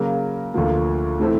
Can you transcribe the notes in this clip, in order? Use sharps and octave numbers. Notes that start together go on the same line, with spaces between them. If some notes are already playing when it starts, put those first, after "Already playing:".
Already playing: C#3 F#3 A#3
D2 D3 F3 A#3
A2 E3 A3 C4 E4